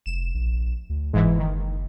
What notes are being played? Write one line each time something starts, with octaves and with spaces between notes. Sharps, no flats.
F1 E7
A#1
D2
F#1 G#2 E3
D#3